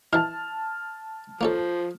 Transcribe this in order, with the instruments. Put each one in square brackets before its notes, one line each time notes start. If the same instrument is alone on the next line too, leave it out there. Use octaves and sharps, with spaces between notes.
[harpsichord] E3 E4 [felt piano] A5 F6
[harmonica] F3 [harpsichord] A#3 C#4 A4